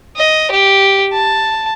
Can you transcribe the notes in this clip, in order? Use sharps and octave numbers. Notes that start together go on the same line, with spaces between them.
D#5
G4
A5